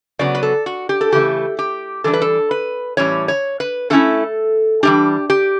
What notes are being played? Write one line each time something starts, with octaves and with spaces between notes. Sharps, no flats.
C#3 F#3 B3 D5
B4
A4
F#4
G4
A4
C#3 E3 A3 G4
G4
E3 G3 D4 A4
B4
A4
B4
A2 E3 G3 C#4 C#5
C#5
B4
D3 A3 C#4 E4 A4
E3 G3 D4 G4
G4